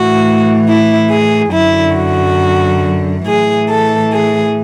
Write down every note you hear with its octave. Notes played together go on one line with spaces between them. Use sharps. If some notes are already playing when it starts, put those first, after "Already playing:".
Already playing: A2 E3 F#4
E4
G#4
F#2 D3 F#3 E4
F#4
A2 E3 G#4
A4
G#4